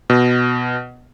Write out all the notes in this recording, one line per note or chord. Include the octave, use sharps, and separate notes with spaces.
B2